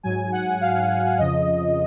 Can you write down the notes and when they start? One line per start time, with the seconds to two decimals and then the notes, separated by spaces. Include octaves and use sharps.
0.03 G#2 F#3 G#5
0.32 F#5
0.61 F5
1.18 F2 C#3 F3 D#5